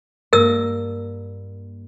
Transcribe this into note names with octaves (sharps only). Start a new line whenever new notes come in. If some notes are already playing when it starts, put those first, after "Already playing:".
G2 A#3 A#4 E6 A#6